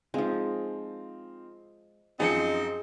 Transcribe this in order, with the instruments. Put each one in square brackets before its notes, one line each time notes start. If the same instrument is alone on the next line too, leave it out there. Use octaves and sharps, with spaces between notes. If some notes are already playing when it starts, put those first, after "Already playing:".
[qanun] F3 G#3 [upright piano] C4 D#4 F4
[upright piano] F#2 F3 C#7 [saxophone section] C4 D#4 [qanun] G#4 D#5